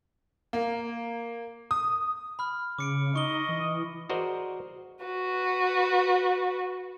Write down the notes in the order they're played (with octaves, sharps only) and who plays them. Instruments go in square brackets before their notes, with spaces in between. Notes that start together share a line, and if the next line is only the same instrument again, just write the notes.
[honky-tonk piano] A#3
D#6
[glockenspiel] B5 F6
[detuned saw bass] C#3 [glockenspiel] D6 C#7 D7
[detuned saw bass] D#4 [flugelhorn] D#5 [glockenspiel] C#6 G7
[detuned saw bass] E3
[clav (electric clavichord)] F#4 G#4 A#4 C5 D5 D#5
[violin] F#4 B4